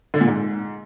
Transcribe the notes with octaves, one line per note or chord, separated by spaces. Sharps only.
D3
A#2
G#2